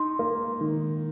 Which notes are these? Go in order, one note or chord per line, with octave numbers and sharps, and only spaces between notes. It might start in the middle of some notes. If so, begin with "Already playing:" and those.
Already playing: D#4 C6
A#3
D#3